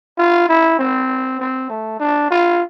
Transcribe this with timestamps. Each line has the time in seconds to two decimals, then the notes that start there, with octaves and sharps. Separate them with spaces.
0.18 F4
0.49 E4
0.79 C4
1.40 C4
1.70 A3
1.99 D4
2.30 F4